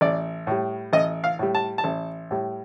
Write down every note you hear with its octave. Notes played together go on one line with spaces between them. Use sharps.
A1 D5
A2 G3
A1 D#5
F5
A2 G3
A5
A5
A1
A2 G3